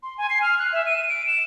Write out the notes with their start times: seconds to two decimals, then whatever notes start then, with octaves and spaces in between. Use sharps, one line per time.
0.03 C6
0.18 G#5
0.30 C7
0.42 F6
0.59 F#6
0.73 E5
0.86 D#7
1.09 D7
1.27 E7